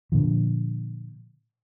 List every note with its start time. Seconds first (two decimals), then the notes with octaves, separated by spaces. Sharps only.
0.12 A#2 D3 F3